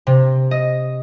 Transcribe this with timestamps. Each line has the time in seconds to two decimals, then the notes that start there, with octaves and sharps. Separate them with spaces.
0.07 C3
0.51 D#5